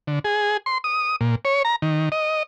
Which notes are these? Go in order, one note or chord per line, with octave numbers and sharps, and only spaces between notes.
D3
G#4
C6
D#6
A#2
C#5
A#5
D#3
D#5